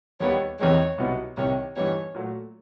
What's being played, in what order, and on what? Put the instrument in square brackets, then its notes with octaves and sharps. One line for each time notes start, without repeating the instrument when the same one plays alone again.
[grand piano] D#2 D#3 G3 B3 [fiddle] C#5
[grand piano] E2 C3 D#3 G#3 [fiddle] C#5
[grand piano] C2 B2 F#3 B3 D#4
[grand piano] C2 C3 D#3 [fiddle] C#5
[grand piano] G2 E3 G3 B3 D#4 [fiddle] C#5
[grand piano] A#2 F#3 A3